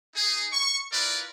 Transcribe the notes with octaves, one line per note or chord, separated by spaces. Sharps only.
D#4 G#4
C#6
E4 F4 A#4 B4 D5